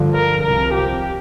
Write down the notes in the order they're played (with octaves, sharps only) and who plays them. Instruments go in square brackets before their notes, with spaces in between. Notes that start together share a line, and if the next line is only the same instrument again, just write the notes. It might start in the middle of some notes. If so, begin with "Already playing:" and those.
Already playing: [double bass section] G2 D3 F3
[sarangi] A#4
[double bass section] C2 C3 F3 [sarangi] A#4
[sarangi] G4